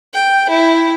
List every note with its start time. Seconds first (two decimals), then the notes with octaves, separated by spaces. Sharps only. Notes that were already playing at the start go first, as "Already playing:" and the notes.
0.13 G5
0.49 E4